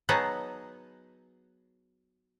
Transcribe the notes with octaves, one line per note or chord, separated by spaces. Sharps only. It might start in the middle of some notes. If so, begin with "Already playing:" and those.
F#3 B3 D#4 G#4 F#5 A5